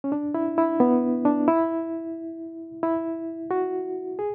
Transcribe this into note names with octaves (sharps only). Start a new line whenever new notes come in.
C#4
D4
E4
E4
B3
D4
E4
E4
F#4
G#4